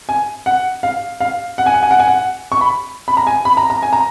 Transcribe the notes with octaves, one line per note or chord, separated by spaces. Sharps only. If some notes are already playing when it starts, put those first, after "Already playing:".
G#5
F#5
F5
F5
F#5
G#5
F#5
G#5
F#5
G#5
F#5
C#6
B5
B5
A#5
G#5
B5
A#5
A#5
G#5
A#5